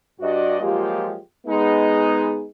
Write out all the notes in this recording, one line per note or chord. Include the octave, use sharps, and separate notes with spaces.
G2 F#4 D5 D#5
F3 F#3 G#3 A#3 F4 G4
G#3 B3 D#4 G#4